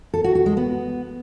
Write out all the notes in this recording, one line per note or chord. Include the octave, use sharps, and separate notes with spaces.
A4
F#4
F#4
G#3
B3